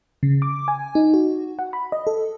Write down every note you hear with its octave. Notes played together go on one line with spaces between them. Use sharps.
C#3
D6
G#5
D#4
F#4
F#5
B5
D#5
A4